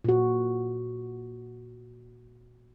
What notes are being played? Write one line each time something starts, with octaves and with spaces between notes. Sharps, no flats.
A#2 F#4